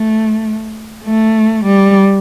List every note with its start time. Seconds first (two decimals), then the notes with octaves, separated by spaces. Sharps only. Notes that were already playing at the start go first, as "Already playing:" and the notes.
Already playing: A3
1.05 A3
1.65 G3